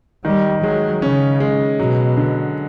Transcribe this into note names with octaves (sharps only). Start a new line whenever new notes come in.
D#3 G3
F#3 G#3
C#3 C#4
G#3
B2 F#3
D3